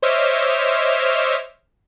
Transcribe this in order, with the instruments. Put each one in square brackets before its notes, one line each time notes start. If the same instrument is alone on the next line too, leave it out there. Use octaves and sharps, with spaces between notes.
[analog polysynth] C5 C#5 D#5 E5 D6 F6